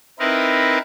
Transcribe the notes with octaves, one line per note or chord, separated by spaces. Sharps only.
C4 D#4 E4 A#4 B4